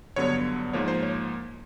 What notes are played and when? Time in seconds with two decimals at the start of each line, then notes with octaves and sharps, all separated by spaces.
0.16 G2 D3 F#3 B3 C#5
0.73 G#2 F3 A#3 C#5
0.88 C5
1.03 C#5